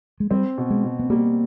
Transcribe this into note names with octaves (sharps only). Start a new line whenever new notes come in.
G#3
G3 C4
B2
G#3
B2
B3
G3 A#3